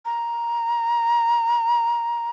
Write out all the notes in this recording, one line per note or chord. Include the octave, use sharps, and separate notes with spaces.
A#5